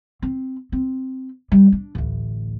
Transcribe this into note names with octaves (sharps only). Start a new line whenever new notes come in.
C4
C4
G3
D4
A1 D2